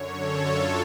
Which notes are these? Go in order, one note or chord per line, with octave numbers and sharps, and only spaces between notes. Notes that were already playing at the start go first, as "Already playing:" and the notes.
Already playing: F#2 D3 C#5
A4
F4